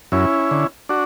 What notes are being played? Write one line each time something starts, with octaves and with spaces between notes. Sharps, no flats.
F#2 C#4 E4
D3
D4 F#4